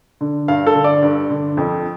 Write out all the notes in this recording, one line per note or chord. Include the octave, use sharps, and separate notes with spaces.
D3
G2 F5
A4
D3
D5
G2
D3
F2